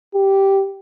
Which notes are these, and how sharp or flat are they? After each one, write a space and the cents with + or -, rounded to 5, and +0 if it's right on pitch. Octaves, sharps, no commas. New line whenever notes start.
G4 -5